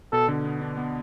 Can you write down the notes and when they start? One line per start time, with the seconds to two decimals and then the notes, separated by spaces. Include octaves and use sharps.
0.13 B2 A4
0.28 D3
0.45 B3
0.61 D4
0.77 B3